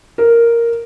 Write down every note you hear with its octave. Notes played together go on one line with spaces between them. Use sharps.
A#4